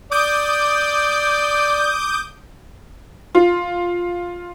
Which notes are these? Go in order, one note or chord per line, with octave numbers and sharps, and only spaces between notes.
D5 D6 D#6 G6
F4